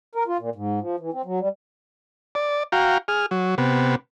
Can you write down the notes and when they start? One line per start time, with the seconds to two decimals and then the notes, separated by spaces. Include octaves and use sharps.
0.15 A#4
0.27 F4
0.39 A#2
0.56 G#2
0.81 F3
0.99 E3
1.13 C4
1.25 F#3
1.40 G3
2.35 D5
2.72 F#4 F5 G5 A#5
3.08 G#4 F6
3.31 F#3
3.58 C3 B3